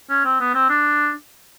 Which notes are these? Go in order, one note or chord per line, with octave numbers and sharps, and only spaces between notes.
C#4
C4
B3
C4
D4